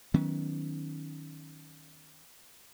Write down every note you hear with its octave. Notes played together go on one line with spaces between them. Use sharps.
D#3 F#3 B3 C#4